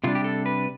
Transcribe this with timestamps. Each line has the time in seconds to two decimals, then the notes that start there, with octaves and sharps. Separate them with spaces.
0.04 C3 E3 G3 D4 F4
0.15 G4
0.24 A4
0.46 B4